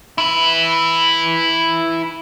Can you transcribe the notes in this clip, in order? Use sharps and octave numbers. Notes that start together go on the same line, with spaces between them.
E4 B4